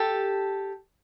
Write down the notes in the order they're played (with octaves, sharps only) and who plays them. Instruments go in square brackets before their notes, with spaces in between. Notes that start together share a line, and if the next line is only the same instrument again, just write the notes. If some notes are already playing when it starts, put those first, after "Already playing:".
Already playing: [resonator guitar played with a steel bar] G4 A4